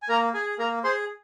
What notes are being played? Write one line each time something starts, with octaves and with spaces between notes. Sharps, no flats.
G#5
A#3 A#4 A#5
G#4 G#5
A#3 A#4 A#5
G#4 C5 C6